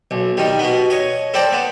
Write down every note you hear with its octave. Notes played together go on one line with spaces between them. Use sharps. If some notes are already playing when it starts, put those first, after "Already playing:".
B1
D#3 G3
B2 B3
C#5 D#5
A4 C5 D5 G5 A#5
B3